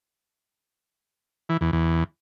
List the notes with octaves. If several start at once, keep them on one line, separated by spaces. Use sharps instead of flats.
E3
E2
E2